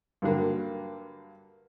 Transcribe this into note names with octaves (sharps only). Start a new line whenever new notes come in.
G2 D3 F#3 A#3